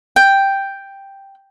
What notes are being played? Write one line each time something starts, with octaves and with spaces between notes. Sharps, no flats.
G5